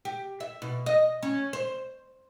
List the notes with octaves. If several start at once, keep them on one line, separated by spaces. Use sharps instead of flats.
G4
E5
B2
D#5
C#4
C5